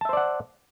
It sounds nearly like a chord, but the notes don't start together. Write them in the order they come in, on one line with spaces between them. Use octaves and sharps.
A5 E5 C5 D5 F#5